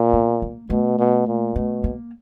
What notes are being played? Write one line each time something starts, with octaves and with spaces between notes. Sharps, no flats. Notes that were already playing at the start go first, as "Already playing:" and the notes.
Already playing: A#2
B3
A#3
B2 A3
B2
A#2
B2 A3
A#3